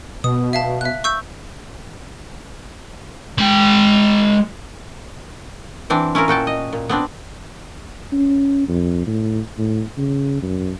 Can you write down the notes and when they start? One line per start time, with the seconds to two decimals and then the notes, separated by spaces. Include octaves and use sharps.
0.24 B2 D#6
0.53 E5 F5 A5
0.81 E5 F#6
1.04 C#6 E6 G6
3.38 G#3 G5
5.90 E3 C4 D4
6.15 C#4 E4 F4 A#4
6.28 A#2 F#4 G5 A5
6.47 D#5
6.73 A#2
6.89 B3 C4 D4
8.12 C#4
8.68 F2
9.07 A2
9.58 A2
9.97 C#3
10.42 F#2